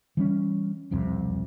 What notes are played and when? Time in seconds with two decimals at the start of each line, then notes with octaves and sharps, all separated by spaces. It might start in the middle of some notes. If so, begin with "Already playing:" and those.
0.17 E3 G3 C#4
0.91 E1 C2 F2 C3